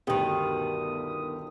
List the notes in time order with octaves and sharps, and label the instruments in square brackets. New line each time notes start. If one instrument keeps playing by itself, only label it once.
[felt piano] G1 D2 A#4 [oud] B2 D#3 [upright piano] G4 [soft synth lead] D#6